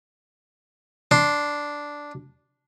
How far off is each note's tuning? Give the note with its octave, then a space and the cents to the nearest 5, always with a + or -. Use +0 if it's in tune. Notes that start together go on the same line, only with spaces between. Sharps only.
D4 -5 C6 +0